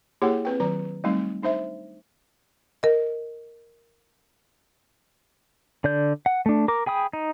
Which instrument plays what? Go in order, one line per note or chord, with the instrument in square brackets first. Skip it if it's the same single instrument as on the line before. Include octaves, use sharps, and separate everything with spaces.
[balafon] A#3 E4 G4 G#4 C#5 F#5
C4 B4 G5
D#3 F#3 B4 A#5
G3 A3 C4 D#4
D4 D#4 C5 E5
[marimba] A#4 D#5
[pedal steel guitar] D3 D5 G6
F#5
A3 D4
A#4 D6
G#4 G5 B5 D#6
D#4